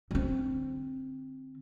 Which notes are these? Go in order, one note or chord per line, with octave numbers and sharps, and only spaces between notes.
D3 C4